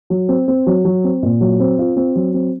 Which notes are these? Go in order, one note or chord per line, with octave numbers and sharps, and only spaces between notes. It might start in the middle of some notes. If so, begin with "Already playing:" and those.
F#3
C4
C4
F#3
F#3
C4
A#2
F#3
C4
F4
C4
F#3
C4